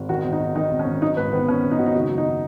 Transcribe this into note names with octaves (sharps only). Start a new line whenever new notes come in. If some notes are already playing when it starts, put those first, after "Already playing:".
Already playing: G#1
D#3 F#4
G#1
D#4
G#1
D#3 D#4
G#1
C#4
G#1
F#3 D#4
G#2 B4
D#3 B3
G#1 C#4
G#1
D#4
D#3 F#4
D#4
F#1 F#4
F#3
D#4